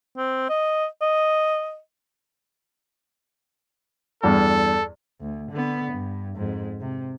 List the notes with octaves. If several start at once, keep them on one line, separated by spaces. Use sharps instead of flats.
C4
D#5
D#5
E2 G2 A4
D2
D3 B3
G2
F2 G#2
C3